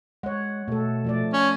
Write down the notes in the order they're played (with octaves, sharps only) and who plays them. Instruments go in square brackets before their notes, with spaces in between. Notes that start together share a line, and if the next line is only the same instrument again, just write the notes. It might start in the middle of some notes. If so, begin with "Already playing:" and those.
[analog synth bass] G#3 [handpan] C#5 F#5
[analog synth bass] B2 [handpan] A3 A4
[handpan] F3 A3 D5
[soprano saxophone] C#4